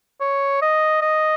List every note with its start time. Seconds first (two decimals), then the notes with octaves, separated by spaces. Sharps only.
0.21 C#5
0.62 D#5
1.02 D#5